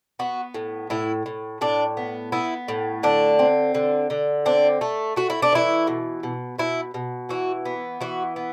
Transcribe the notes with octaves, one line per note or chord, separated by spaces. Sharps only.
B3 F#4
A2
A2 E4
A2
A2 D4
B3
B3 E4
A2
D3 D4
C4
D3
D3
C4 D4
A3
A3 F#4
E4
D4
E3 E4
B2
B2
B2 E4
B2
E3 F#4
B3
E3 F#4
B3